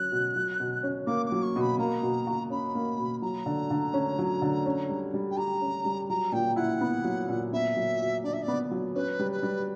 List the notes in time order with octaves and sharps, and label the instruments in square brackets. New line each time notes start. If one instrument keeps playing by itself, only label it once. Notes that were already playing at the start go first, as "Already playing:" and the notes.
Already playing: [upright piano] F#3 C#4 [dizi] F#6
[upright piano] B2
F#3
B2
C#4
[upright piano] A#3 [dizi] D6
[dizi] D6
[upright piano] F#3
[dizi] C#6
[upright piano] B2 [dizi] B5
[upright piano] A#3 [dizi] A#5
[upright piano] B2
F#4
[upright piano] C#4 [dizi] B5
[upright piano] A#3
B2
[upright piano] F#3 [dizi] A#5
[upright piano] D3
D3
C#4
F#3
D3
C#4
G3
G3
[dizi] G5
[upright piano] G4 [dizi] A#5
[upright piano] C#4
G3
[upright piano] F#3 [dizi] A#5
[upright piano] A#2 [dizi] G5
[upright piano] E4 [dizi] F#5
[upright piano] B3
F#3
A#2
[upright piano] B3 [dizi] E5
[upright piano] F#3
F#4
[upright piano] D4 [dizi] D5
[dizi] E5
D5
[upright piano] B3
F#3
[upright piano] C#4 [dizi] B4
[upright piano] G3
[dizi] B4
[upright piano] G3